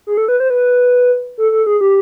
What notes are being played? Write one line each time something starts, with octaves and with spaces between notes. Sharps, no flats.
G#4
A4
B4
C5
B4
A4
A4
G#4
G4